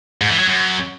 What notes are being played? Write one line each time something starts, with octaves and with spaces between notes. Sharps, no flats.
G#2
E3
F#3
F#2